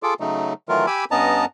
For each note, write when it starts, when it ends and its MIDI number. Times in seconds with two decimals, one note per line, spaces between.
0.03 0.14 65
0.03 0.14 68
0.03 0.14 69
0.03 0.14 86
0.20 0.53 49
0.20 0.53 54
0.20 0.53 57
0.20 0.53 63
0.69 0.86 51
0.69 0.86 52
0.69 0.86 54
0.69 0.86 57
0.69 0.86 65
0.69 0.86 70
0.87 1.05 67
0.87 1.05 80
0.87 1.05 83
0.87 1.05 86
0.87 1.05 88
1.11 1.45 43
1.11 1.45 59
1.11 1.45 61
1.11 1.45 75
1.11 1.45 81
1.11 1.45 82